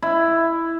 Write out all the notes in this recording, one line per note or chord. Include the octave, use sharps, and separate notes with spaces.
E4